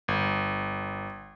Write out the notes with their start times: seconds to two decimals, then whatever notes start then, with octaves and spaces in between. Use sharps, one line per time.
0.08 G1